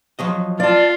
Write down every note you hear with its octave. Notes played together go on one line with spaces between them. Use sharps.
F3 F#3 D#5
F4 D5 A5